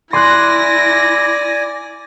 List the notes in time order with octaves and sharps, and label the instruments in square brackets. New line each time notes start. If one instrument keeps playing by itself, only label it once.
[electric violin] E4 A#6 [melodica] D5 G#5 [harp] C6 F#6